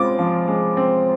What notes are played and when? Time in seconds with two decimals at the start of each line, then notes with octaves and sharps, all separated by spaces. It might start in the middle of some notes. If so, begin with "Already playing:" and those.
Already playing: G#3 C4 F4 D6
0.18 F3
0.48 G#3
0.77 C4